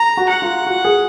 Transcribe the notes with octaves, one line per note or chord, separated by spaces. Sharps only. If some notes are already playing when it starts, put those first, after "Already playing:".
Already playing: A#5
F#4
F#5
F4
F#4
G#4